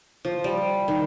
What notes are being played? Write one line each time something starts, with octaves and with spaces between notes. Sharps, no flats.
F3
G3
D#3